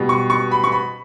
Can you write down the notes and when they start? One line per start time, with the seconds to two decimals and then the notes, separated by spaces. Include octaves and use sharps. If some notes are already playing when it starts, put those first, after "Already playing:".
Already playing: B2 G3
0.09 C#6
0.30 C#6
0.51 B5
0.64 C#6
0.72 B5